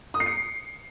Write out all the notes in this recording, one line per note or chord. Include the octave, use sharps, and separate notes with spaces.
D#6
C7
C#7